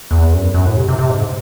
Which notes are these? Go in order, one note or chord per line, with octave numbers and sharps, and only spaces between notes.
E2
F#2
F#2
A2
C3
C3
C3
G#2